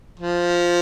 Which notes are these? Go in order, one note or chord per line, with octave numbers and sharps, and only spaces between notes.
F3